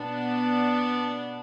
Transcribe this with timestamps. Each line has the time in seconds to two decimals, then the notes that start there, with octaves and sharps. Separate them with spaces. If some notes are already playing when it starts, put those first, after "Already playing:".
Already playing: B2 B3 D4
0.82 B2